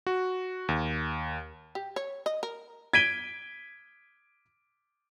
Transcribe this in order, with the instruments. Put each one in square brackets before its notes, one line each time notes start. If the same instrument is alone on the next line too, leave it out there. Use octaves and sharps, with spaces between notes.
[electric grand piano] F#4
D#2
[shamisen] G4
C#5
D#5
A#4
[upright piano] G#6 B6 D7 D#7 G7